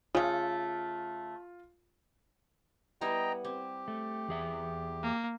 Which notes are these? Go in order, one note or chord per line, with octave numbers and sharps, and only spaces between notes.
C#3 A3 F4
G3 B3 E4 D#5 G5 A#5
C4 G4
A3
E2 G#4 E5
A#3